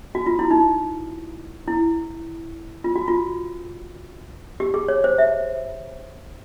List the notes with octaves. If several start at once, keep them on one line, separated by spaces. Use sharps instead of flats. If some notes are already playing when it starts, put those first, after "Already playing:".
F#4
F4
E4
D#4
E4
F4
F#4
F4
G4
G#4
C#5
C5
E5